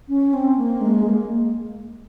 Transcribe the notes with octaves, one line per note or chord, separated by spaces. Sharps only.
C#4
C4
A#3
G#3
A#3